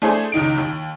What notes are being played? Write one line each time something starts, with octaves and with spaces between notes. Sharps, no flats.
A3 D4 G#4 A4 C5
C#2 D#3 D#4 D7
D#2